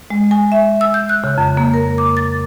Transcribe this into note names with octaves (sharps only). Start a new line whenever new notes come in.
G#3
G#5
E5
E6
G6
F#6
C#3
F2
A#3
A#4
D6
A6